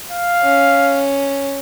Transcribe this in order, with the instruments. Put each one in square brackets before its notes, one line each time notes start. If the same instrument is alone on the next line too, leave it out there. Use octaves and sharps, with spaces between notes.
[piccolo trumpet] F5
[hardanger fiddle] C#4